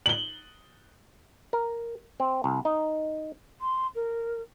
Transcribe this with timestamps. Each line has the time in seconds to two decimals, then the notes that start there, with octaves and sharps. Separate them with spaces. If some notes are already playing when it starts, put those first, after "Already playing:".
0.06 F#7 G7
1.53 A#4
2.20 C4
2.44 C2
2.65 D#4
3.60 C6
3.95 A#4